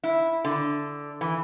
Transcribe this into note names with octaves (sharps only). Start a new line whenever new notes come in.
E4
D3
E3